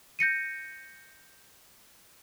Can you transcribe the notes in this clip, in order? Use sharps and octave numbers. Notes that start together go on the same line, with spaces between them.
G6 A#6 C#7 D#7